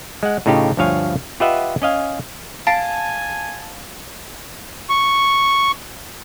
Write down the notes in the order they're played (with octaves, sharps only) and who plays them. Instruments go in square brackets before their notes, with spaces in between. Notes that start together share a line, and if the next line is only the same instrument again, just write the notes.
[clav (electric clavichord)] G#3 F#5
A2 C#3 D#4 F4 G4
D2 G2 F3 C#5 F5 G#5
F4 G4 B4 D#5 E5 F#5
C#4 D#5 F5 G#5
[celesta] F5 [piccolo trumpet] G#5 [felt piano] A5 [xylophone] A6 C7 D7
[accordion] C#6